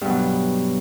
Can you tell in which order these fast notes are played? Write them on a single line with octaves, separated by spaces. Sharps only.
G2 B2 F#3